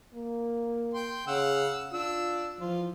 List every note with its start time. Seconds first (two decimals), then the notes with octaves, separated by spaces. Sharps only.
0.14 A#3
0.94 G5 C6
1.27 C#3 F5 F#5 E6
1.93 D4 F4 E6
2.60 E3 F3 F4